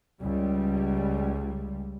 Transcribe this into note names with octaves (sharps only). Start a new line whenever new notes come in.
C#2 G3